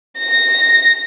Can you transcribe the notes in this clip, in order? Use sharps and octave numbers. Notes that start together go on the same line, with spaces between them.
A#6